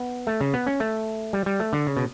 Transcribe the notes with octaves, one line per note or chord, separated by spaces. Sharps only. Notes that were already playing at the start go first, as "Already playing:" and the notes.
Already playing: B3
A3
C#3
B3
C#4
A3
G3
G3
A3
D3
C#3
B2